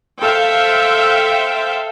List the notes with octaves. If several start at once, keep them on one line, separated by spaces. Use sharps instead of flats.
A4 C5 E5 F5 G5